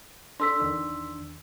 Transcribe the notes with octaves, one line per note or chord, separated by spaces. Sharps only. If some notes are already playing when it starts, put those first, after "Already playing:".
D4 A4 C6 E6 B6
E2 D#3 D4